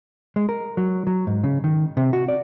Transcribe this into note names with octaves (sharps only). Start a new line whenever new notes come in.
G#3
A#4
F#3
F#3
G#2
C#3
D#3
C3
F#4
D5